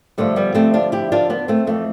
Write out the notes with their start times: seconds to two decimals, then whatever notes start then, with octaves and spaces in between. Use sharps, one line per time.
0.18 G2 D3 F3 A3
0.36 G3 B3
0.54 A3 C4
0.74 D4 F4
0.92 E4 G4
1.12 D4 F4
1.30 B3 D4
1.48 A3 C4
1.67 F2 E3 A3